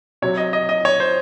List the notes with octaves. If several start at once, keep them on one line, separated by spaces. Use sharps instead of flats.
C3 F#3 C#5
D#5
D#5
D#5
C#5
C5